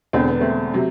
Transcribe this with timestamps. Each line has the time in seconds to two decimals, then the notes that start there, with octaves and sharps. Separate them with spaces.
0.13 E1 E2 D3 C4
0.28 B3
0.40 A3 C4
0.74 C3 F#3